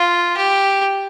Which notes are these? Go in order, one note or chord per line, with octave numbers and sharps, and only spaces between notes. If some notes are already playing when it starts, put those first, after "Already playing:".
Already playing: F4
G4